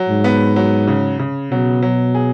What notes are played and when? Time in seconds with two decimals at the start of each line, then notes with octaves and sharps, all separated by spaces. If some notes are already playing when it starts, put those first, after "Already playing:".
Already playing: F#3
0.09 G#2
0.24 B3
0.56 F#3
0.88 C#3
1.20 C#3
1.51 B2 F#3
1.82 F#3
2.15 G#4